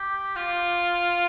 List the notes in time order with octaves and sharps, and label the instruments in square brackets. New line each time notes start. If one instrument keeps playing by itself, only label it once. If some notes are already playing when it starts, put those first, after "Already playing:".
Already playing: [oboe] G4
F4